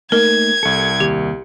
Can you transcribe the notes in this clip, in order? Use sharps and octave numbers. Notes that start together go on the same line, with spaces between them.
A3 A#3 D#4 A#4 G#6
C2 A4 C#7
D#2 G4